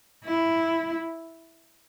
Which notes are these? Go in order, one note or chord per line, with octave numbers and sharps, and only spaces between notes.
E4